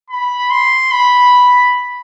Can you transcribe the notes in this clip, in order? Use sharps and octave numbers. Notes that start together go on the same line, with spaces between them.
B5
C6
B5